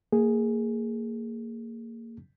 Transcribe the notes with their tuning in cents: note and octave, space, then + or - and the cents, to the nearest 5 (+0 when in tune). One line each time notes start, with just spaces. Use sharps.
A#3 -25 G#4 +0